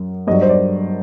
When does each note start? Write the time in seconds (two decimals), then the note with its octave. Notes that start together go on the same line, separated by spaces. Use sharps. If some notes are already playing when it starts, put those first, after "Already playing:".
Already playing: F#2 F#3
0.27 G2 D#5
0.31 F#3 D5
0.42 C5
0.49 D5